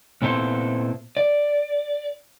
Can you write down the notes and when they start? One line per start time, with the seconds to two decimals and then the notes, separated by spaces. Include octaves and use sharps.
0.22 A#2 B3 C4 E4 A4 C5
1.17 D5